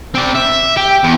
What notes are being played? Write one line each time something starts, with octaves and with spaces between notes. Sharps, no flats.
C4 D5
E5
G4
E2